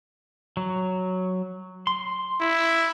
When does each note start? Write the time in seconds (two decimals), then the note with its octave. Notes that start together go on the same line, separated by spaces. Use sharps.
0.57 F#3
1.87 C6
2.41 E4